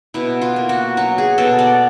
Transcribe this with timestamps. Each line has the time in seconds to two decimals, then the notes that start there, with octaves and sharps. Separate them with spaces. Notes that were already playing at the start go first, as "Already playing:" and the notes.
0.14 B2 E4
0.41 F4
0.56 A#3
0.69 F#4
0.97 F#3 F#4
1.18 G#4
1.38 B2 A4
1.59 D5